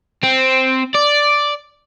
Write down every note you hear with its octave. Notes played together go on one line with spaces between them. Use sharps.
C4
D5